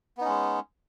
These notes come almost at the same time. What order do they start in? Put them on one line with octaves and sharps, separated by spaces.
B3 D#4 C#4 G#3